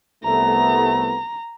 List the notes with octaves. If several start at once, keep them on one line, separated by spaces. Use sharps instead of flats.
C2 A3 B3 A#5